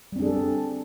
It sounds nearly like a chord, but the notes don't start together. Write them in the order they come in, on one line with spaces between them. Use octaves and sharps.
G3 C4 D4 G#4 A4